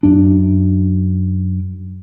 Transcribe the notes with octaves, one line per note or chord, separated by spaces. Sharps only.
F#2 D4